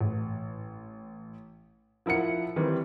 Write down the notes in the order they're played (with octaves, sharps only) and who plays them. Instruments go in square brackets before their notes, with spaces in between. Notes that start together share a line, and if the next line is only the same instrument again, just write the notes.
[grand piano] A1
F3 E4 A#4 F#5 C#7
D#3 E3 G3 C4